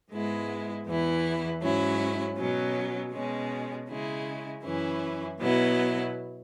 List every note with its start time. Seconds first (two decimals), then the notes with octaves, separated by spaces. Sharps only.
0.11 G#2 G#3 B3 E4
0.86 E2 E3 B3 E4
1.62 G#2 F#3 C#4 E4
2.37 B2 F#3 C#4
3.13 B2 G#3 C#4
3.88 C#3 G#3 E4
4.63 F#2 E3 C#4 E4
5.38 B2 F#3 B3 E4